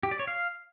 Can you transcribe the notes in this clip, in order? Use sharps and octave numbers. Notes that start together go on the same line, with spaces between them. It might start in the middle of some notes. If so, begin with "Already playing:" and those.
G4
D5
C#5
F5